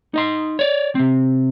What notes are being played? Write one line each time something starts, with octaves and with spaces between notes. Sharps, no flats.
D#4 D#5 C6
C#5 D5
C3 C4